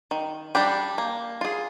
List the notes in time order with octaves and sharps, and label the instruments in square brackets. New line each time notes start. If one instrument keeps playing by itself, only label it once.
[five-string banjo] D#3
G3 D4 G4
A#3
F4 G#4